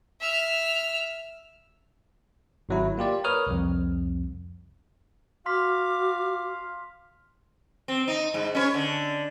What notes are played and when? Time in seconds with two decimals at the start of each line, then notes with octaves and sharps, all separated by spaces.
0.21 E5 F6
2.69 G#1 F#3 E4
2.97 A#3 F4 G4 D5
3.24 A#4 B4 C#5 D#6 F6
3.47 C2 F2
5.46 F#4 F5 C6 D6 F6 B6
7.88 C4
8.08 D#4
8.34 G#2
8.55 C#4 B4 C#5
8.74 D3